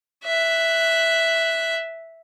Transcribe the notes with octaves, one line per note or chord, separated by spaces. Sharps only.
E5 F#6